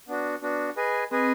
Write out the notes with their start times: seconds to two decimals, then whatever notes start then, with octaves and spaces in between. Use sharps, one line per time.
0.08 B3 D4 F#4
0.42 B3 D4 F#4
0.77 G#4 B4 D#5 G#5
1.11 C4 G#4 B4 D#5 G#5